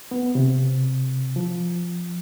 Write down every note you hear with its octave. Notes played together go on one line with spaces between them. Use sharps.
B3
C3
F3